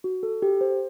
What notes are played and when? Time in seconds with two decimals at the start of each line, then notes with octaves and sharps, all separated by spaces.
0.04 F#4
0.23 A4
0.42 G4
0.61 C5